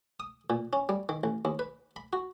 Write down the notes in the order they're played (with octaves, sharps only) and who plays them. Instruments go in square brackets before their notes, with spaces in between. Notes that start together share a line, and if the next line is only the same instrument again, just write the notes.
[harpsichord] D#6
A#2
C#4
G3
D#3
A1
D#2
B4
B5
F#4